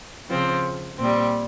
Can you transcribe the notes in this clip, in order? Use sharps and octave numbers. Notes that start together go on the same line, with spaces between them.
C#3 F3 C4
A#2 G3 C4